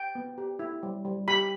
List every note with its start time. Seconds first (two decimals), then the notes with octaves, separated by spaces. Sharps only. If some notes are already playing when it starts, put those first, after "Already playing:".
Already playing: G5
0.15 B3
0.38 G4
0.59 E4
0.83 G3
1.05 G3
1.28 G4 B5